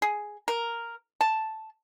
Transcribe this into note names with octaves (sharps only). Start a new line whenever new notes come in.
G#4
A#4
A5